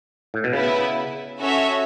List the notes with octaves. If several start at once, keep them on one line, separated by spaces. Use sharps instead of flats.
A2
B2
C#3 B3 E4 B4
C#4 F#4 A4 C#5 E5